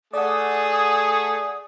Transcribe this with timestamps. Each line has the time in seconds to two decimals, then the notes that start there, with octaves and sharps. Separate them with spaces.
0.13 A3 G#4 D5 F#5 D#6